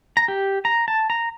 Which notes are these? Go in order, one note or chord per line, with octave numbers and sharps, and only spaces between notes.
A#5
G4
A#5
A5
A#5